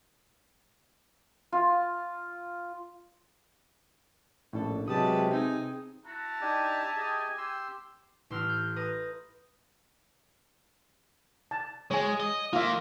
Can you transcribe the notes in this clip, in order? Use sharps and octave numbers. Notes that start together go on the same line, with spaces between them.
F4
A#1 A2 C#4 D4 A4
C3 F#3 G#3 G4 B4 A5 D#6
C4 D#4 G#4 G#5
E4 F#4 A5 A#5
D4 D#4 G4 G#5
G4 G#4 D#5
G4 C6 E6
A1 C6 E6 F6
G6
B4 A#5 D#6
A5
G#3 C#5 G#5
D#5
D#2 A#3 F4 E5